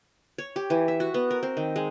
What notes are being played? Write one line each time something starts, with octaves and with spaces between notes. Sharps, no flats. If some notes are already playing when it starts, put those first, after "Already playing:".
C#5
G4
E3
E5
F#4
B3
A#4
C4
D#3
G#3